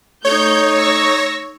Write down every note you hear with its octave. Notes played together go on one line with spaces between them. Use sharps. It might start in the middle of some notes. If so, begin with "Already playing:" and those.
A3 D#4 C#5 G6
C#6 E6 A#6